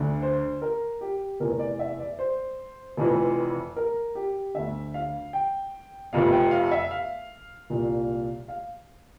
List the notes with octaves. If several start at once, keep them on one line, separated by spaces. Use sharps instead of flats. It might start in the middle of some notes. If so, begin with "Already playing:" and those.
Already playing: D2 D3
C5
A#4
G4
F1 E2 E3 A#4
D5
E5
D5
C5
F1 F2 E3
A#4
G4
D2 D3 E5
F5
G5
F1 F2 C3 F5
G5
F5
E5
F5
C2 A#2
F5